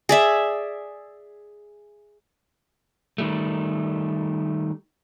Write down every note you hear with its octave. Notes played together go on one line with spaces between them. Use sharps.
G#4 D5 E5
D#3 G3 A3